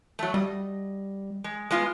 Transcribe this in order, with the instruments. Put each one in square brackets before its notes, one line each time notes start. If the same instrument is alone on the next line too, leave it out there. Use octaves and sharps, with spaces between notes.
[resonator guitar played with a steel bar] F#3 A3
[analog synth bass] G3 [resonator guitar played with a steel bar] D#5
[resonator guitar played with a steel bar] G#3
G#3 B3 F4